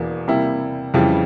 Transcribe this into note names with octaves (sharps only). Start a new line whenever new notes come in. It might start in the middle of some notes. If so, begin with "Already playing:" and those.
Already playing: E1 E2 E3 A#3
C3 G3 A#3 E4
F2 C#3 E3 G3